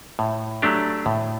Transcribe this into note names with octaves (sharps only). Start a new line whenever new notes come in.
A2
F#3 A3 D4 G4
A2